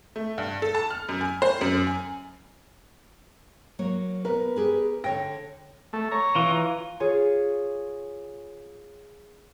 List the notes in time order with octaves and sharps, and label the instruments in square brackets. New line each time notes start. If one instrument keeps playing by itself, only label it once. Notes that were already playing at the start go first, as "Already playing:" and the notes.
[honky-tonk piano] A3
G2
A4
A5
F6
F#2
G#5
C5
F#2
G#5
[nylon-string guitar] F#3 A#3 C#5
[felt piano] B3 A#4 [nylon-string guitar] B4
[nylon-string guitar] G4 G#4 B4
[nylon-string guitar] D3 C#5 G5 [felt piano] A#6
[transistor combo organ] A3
C#5 A#5
[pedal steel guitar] E3 F4
[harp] F4 G#4 C#5